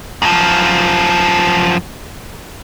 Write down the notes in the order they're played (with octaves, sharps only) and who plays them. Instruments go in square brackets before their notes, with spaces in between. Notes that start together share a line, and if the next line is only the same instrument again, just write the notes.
[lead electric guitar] F#2 F3